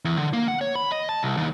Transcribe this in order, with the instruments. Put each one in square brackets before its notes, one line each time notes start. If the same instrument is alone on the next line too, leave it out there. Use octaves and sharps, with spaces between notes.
[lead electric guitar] E2
D3
A#3
F#5
C#5
B5
D#5
A5
C2
D#2